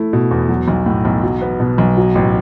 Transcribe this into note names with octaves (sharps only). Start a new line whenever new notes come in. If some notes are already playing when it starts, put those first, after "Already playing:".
Already playing: A3 E4
B2
E2
F#3
B1
A2
B1
F#3
B3
B2
B1
F#3
A1